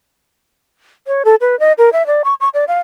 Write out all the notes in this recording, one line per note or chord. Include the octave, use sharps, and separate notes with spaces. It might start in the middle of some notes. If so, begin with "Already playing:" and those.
C#5
A4
B4
D#5
A#4
E5
D5
C#6
C#6
D5
F5